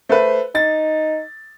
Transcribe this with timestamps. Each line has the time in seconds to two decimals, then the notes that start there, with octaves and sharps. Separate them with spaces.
0.09 A3 B4 C5
0.55 D#4 A6